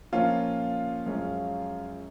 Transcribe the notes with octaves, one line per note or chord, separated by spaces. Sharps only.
A#2 F3 A#3 C#4 F4
F#2 F3 G#3 C#4